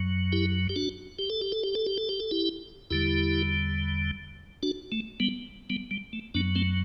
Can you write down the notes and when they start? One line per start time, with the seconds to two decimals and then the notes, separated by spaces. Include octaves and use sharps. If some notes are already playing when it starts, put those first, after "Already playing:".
Already playing: F#2 F#3
0.32 E4 G4
0.69 G4
0.76 D4 F#4
1.19 G4
1.30 A4
1.42 G4
1.52 A4
1.64 G4
1.75 A4
1.86 G4
1.98 A4
2.09 G4
2.20 A4
2.31 E4 G4
2.91 E2 D3 G3 E4 G4
4.63 D4 F#4
4.92 A3
5.20 G3 B3
5.70 G3 B3
5.91 G3
6.13 A3
6.34 F#2 F#3 B3 D4
6.56 A3 C4